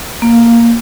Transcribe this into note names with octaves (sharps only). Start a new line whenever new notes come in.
A#3